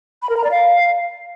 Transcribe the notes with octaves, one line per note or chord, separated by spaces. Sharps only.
B5
A#4
A#5
D5
F5